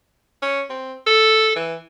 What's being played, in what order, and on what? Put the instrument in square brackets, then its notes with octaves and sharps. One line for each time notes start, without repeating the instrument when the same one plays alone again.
[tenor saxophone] C#4
C4
A4
E3